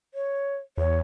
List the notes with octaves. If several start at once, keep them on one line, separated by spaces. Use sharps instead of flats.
C#5
E2 C#5